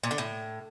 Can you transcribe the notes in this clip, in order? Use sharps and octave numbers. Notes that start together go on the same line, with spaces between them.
A#2
D3
A2